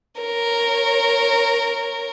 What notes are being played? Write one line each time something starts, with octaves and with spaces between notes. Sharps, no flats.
A#4 C#5